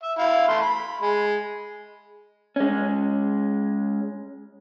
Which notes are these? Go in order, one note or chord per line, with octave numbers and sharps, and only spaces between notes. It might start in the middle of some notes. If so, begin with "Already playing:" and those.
E5
E4 F5
A3 C6
B5
G#3
G#3 C#4